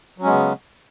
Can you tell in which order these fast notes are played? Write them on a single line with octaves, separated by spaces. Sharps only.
F#3 C#4 G#3 B3 C#3